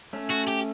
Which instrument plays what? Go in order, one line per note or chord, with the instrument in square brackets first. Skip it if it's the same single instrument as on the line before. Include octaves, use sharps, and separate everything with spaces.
[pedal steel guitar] A3 C#4
[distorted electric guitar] F#4
G4